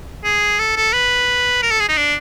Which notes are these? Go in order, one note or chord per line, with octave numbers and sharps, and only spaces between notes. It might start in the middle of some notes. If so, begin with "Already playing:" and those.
G#4
A4
A4
B4
A#4
A4
G#4
D#4
D4